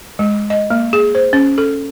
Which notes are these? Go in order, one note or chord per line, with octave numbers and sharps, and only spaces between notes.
G#3
D#5
A#3
G#4
C5
C#4
A4